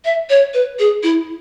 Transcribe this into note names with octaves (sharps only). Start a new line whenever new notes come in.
E5
C#5
B4
G#4
E4